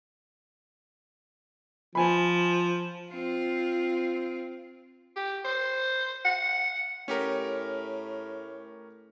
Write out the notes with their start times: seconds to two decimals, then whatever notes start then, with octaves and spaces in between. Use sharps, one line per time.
1.95 F3 G#5 B5
3.10 C4 F4
5.17 G4
5.45 C5
6.25 F#5
7.08 A2 C#4 G4 A#4